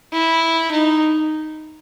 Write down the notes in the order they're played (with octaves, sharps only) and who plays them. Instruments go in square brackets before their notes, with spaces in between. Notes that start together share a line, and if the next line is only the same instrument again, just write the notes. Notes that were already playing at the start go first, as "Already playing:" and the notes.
[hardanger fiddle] E4
D#4